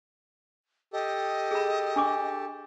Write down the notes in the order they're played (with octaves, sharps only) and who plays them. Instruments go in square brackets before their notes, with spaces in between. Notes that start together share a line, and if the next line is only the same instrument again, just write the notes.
[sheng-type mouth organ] G4 A4 [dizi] D#5
[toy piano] G#4 B5
D4 C#6 D6